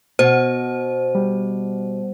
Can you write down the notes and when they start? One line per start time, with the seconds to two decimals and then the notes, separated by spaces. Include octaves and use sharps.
0.19 B2 C5
1.15 G3